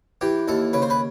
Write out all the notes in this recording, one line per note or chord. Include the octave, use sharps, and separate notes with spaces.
E3 G4
D#2 A4
C#3 B4
C5
B4